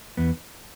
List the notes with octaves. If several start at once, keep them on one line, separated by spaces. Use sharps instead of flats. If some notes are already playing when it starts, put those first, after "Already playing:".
E2 B3